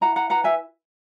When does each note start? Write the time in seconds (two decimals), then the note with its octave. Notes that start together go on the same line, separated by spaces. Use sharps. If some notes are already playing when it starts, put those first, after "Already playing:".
0.01 E4 F#5 A#5
0.16 F#5 A#5
0.30 B4 F#5 A#5
0.44 E5 G#5